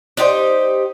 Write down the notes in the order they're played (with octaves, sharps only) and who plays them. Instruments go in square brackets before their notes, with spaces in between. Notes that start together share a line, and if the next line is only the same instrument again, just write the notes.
[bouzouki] D4 D#4 G4 C5